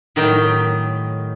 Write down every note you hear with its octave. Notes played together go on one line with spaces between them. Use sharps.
A2 D#3 F#3 D#4 G4 G5